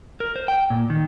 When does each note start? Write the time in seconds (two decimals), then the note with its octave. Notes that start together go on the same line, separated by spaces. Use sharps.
0.20 A#4
0.36 C5
0.48 G5
0.70 A#2
0.90 D#3